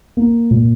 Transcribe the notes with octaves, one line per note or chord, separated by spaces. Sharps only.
A#3
A#2